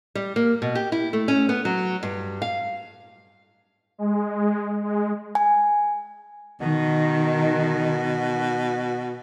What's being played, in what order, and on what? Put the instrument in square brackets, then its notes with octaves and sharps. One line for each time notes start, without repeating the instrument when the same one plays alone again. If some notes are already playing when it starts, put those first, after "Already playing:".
[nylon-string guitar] G3
A#3
B2
G4
E4
A3
C#4
B3
F#3
G2
F5
[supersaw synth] G#3
G#3
[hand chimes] G#5
[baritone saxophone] B2 [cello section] D#3